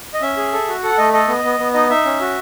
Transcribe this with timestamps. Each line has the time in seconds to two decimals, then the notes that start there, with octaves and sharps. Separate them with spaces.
0.14 D#5
0.22 C#4 E5
0.37 G#4
0.53 A4
0.68 F#4
0.83 A4 F#5
0.98 A3 D#5
1.13 A4 D#5
1.28 B3
1.44 B3
1.59 B3
1.74 D#4 D#5
1.90 D#4 E5
2.05 C#4
2.21 F#4